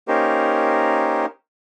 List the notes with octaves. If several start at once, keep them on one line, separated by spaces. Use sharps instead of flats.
A#3 C#4 D#4 G4 A#4 C5